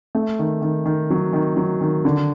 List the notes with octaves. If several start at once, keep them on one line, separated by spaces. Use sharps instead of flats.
A3
D#3
D#3
D#3
F#3
D#3
F#3
D#3
D3